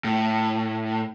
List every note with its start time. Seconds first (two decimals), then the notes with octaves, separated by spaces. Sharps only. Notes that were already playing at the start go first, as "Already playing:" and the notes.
0.04 A2